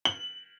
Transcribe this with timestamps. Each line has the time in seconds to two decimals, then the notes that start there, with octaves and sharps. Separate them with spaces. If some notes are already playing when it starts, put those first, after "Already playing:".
0.05 F#7